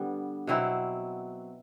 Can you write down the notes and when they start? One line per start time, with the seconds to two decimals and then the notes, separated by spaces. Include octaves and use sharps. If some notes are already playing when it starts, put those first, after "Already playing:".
Already playing: D3 G3 B3
0.47 B2 F#3 C4 E4